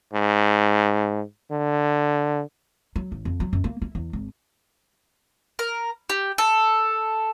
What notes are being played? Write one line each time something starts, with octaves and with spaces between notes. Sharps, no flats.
G#2
D3
F#3
A1
F2
F#3
F#2
A#3
E4
E2
G#1
A#4
G4
A4